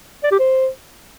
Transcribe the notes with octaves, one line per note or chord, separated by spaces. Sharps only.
D5
G4
C5